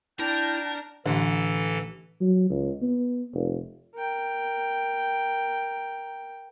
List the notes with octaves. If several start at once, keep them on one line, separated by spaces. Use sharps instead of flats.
D4 E4 A#4 G5 A5 G6
A1 D3 E3 A4
F#3
C#2
B3
F1
A#4 G5